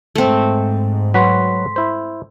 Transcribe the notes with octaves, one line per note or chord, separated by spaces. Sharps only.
G#2 A3 C4
F#3 F#4 B4 C6 B6
E4 C5